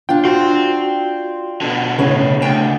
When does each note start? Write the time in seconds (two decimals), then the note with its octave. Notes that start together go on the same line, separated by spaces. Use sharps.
0.09 D4 F4 G5
0.25 F#4 G5 C6
1.61 B2 D3
1.99 A2 C#3 C#5
2.42 D2 G5